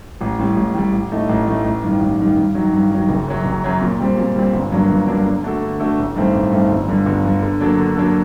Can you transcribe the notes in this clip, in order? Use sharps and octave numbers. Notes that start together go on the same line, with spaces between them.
A1
A2 G3
A1
A2 G3
A1
A2 A3 D#4
A1
A2 A3 D#4
A1
G2 D#3
A1
G2 D#3
G2
D#3 F#3
G2
D#3 F#3
F#1
F#2 F#3
F#1
F#2 F#3
A#2
G3 C4
A#2
G3 C4
G1
G2 F#3 A#3 D4
G1
G2 F#3 A#3 D4
D3
A3 D4 F#4 A4
D3
A3 D4 F#4 A4
A1
G2 D#3 A3 C4
A1
G2 D#3 A3 C4
G1
G2 D3
G1
G2 D3
D3
F#3 A#3 D4 A4
D3
F#3 A#3 D4 A4